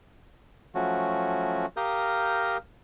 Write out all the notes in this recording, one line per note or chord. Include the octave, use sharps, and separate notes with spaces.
F3 F#3 A3 C#4 F#4
G4 A#4 F5 A#5 D#6 G6